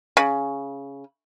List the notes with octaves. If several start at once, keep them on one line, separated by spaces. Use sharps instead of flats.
C#3